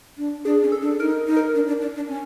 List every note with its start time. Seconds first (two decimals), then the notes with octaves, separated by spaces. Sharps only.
0.18 D4
0.45 D4 G#4
0.63 C#4
0.72 A4
0.81 D4
1.00 D#4 A#4
1.27 D#4
1.36 A#4
1.54 D4
1.67 D4
1.82 D4
1.96 D4
2.08 C#4